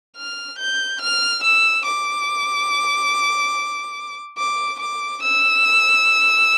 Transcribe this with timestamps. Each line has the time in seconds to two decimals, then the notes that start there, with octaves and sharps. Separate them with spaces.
0.16 F6
0.58 G6
1.01 F6
1.43 E6
1.85 D6
4.38 D6
4.80 D6
5.23 E6